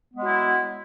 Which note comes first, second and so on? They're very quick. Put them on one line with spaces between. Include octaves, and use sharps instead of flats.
B3 G#3 F#3 E4